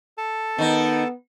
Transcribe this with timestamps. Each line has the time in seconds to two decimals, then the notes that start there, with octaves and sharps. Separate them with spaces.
0.18 A4 A5
0.58 D#3 B3 D#4